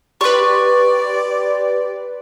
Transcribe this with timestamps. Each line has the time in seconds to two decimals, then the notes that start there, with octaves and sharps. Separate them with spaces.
0.21 G4 B4 D5 C6 C#6 F#6